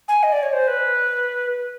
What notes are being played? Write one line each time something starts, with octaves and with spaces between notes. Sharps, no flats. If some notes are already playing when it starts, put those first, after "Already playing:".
G#5
D#5
D5
C#5
C5
B4